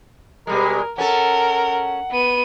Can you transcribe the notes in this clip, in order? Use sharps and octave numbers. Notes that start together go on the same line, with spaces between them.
B2 G3 G#3 A#4
C#4 A4 A#4 F#5
B3 D#7